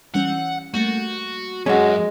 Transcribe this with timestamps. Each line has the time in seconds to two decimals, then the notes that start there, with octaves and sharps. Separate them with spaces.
0.15 E3 G3 C#4 F#5
0.74 G3 A3 A#3 F#4
1.66 F#2 G#3 C#4 F#4